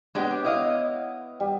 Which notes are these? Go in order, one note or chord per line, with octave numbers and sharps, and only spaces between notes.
G#3 B3 D4 G4 C#5
E4 D#5 F5
G3